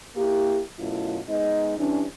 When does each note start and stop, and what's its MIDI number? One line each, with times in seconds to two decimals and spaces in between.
0.16 0.60 58
0.16 0.60 64
0.16 0.60 67
0.79 1.20 42
0.79 1.20 47
0.79 1.20 57
0.79 1.20 64
0.79 1.20 65
1.28 1.77 56
1.28 1.77 59
1.28 1.77 63
1.28 1.77 75
1.78 2.04 52
1.78 2.04 55
1.78 2.04 61
1.78 2.04 62